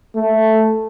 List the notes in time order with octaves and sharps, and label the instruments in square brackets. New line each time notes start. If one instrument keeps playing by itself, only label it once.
[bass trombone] A3